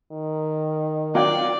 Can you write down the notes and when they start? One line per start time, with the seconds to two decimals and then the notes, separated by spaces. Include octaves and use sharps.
0.12 D#3
1.15 F#3 F4 D5 G5